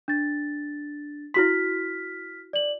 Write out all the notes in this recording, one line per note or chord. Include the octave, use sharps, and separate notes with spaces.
D4 A6
E4 F#4 C6 F6 B6
D5 F#7